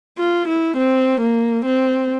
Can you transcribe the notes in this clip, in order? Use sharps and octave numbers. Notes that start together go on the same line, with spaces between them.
F4
E4
C4
A#3
C4